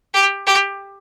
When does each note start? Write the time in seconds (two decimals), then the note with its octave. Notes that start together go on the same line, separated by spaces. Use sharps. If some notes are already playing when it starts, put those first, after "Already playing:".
0.14 G4
0.47 G4